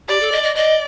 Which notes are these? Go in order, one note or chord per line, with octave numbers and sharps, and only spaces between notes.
G4 D5
A4
D#5
D#5
D5 D#5